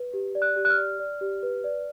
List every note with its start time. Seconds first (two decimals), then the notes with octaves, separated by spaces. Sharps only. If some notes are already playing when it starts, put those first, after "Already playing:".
Already playing: B4
0.13 G4
0.35 D5
0.42 F#6
0.56 G4
0.65 F#6
0.70 F6
0.78 D5
1.00 D5
1.21 G4
1.43 B4
1.64 D5